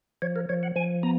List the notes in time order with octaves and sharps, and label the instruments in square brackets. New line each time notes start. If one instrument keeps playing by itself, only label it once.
[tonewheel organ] F3 C#5
A#4
F3 C#5
F#5
F3 G#5
B3 A#5